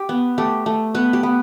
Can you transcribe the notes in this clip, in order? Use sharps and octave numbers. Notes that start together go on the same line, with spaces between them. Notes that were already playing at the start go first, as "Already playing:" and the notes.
Already playing: G4
B3
A3 G4
A3
B3 B4
G4
B3